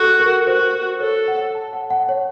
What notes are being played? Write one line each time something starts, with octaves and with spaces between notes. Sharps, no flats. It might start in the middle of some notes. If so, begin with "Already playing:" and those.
Already playing: F#4 A4
A#4
F#4 C5
A4 C#5
F#5
A5
F#5
F#5
C#5